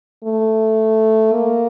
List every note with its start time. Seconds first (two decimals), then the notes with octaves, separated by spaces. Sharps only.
0.24 A3
1.32 A#3